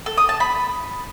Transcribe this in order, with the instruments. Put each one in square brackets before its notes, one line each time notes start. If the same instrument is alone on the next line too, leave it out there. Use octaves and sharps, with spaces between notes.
[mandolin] A4
D#6
A5
B5